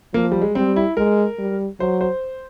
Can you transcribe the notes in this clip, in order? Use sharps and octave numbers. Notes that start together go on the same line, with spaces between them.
F3 A#3
G3
G#3
G3 C4
E4
G#3 A#4
G3
F#3 C5
C5